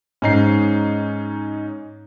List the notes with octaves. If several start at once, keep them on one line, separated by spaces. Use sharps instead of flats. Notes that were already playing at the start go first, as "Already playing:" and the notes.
G#2 C#4 D#4 C7